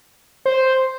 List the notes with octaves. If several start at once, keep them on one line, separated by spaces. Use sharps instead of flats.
C5